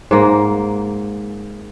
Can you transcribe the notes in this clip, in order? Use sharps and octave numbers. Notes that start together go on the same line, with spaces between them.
G#2 A#3